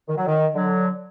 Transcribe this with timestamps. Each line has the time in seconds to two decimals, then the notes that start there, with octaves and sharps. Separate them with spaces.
0.08 D#3
0.17 F#3
0.27 D#3
0.55 D3 F#3